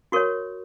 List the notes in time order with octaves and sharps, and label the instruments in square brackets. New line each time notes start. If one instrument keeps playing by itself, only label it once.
[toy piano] F#4 A#4 C#5 C#6